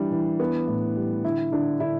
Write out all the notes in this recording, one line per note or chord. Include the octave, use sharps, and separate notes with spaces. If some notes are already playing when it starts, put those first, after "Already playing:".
Already playing: E3 G3 D4
E3
B3
A2
G3
D3 E4
D3 D4
D3 E4